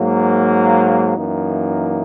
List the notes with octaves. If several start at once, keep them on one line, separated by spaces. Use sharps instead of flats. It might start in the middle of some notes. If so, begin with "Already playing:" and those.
Already playing: G#2 F#3 A#3
F#2 E3 A#3 D#4